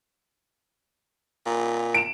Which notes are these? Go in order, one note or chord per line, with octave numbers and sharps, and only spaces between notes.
A#2
D7 E7